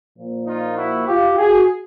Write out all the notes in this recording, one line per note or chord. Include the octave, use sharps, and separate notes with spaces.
A#2 F3 A#3
D#4 F4
E4 F#4
F4 G4
F#4 G#4